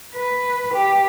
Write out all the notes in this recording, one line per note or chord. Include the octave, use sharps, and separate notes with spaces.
B4
G4